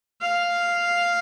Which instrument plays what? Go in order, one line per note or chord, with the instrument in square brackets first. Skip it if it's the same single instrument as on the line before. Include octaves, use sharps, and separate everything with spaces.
[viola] F5